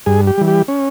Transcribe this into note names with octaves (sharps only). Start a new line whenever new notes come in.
G2 G#4
G4
E3 G3
G4
C#4